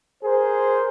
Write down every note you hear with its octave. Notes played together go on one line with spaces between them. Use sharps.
G#4 A#4 C5